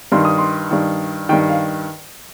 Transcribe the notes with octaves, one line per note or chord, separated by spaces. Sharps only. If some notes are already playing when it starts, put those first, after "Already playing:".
G2 D#3 C6
D#6
C6
G2 D#3
G2 D#3 G5
F5